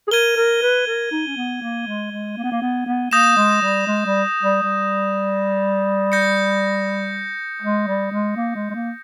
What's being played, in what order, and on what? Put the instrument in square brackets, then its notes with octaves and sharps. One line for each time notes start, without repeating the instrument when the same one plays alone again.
[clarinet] G#4
[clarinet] A#4 [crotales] G#6 D#7 G7
[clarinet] A#4
B4
A#4
D#4
C#4
B3
A#3
G#3
G#3
A#3
B3
A#3
B3
B3
[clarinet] A#3 [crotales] D#6 G6 A#6 E7
[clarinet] G#3
G3
G#3
G3
G3
G3
[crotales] G6 A#6 C#7
[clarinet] G#3
G3
G#3
A#3
G#3
G#3
A#3